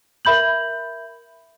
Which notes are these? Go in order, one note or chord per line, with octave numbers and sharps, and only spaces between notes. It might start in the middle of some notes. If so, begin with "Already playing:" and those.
A#4 E5 B5 G6 F#7